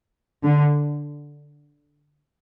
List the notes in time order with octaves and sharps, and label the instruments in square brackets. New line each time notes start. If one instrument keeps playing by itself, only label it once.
[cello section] D3